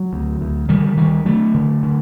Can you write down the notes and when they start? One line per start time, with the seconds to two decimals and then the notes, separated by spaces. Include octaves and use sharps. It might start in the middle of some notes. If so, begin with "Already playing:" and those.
Already playing: F#3
0.13 D2
0.41 D2
0.69 D3 D#3 G3
0.97 D2 D#3 G3
1.25 D3 F#3 A3
1.54 D3
1.83 D3